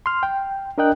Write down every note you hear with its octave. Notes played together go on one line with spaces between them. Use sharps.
C6 F6
G5
D4 A#4 D#5 G5 F#6